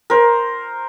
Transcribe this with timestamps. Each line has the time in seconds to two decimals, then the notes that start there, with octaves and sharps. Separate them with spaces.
0.10 A#4 C5